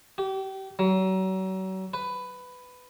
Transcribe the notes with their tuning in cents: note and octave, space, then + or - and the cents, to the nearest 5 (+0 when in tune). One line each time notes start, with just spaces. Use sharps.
G4 -30
F#3 +35
B4 +10